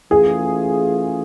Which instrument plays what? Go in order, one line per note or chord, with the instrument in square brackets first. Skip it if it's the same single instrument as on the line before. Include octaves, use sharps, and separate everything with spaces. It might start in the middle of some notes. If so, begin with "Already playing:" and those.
[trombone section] E3 A3 C#4 F4 [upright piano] G#4